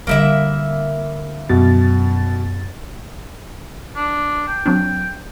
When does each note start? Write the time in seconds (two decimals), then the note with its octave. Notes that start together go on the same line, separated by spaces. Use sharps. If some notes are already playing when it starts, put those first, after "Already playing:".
0.07 D3 G3 A#3 E4 E5
1.50 F#2 B2 A6
3.96 D4
4.48 G5
4.66 F#3 C4 D4